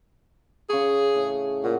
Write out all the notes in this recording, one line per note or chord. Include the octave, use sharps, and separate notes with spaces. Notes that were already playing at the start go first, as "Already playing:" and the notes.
C#3 G#4 C#6
A2
A#2 F#4